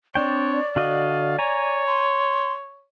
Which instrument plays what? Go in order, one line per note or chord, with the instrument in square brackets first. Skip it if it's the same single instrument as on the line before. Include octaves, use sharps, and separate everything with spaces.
[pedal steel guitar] C4 D4 G5 [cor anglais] C#5 [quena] D5
[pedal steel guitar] D3 F#4 D#5 [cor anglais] F5
[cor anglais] C#5 [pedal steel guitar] G#5 A#5
[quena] C6